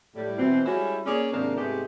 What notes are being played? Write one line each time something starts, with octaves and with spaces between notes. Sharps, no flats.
A2 G3
B2 E3 C4
G3 G#3 C#4 E4 F#4
A#3 C#4 G#4 C#5 D5
G#2 C3 D#3 A#3 C4 D4
G#2 C3 G#3 A3 B3 G4